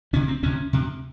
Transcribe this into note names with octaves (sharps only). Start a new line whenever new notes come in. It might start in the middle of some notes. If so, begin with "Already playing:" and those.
D2 C3 C#4
C4
D2 C3 C#4
D2 C3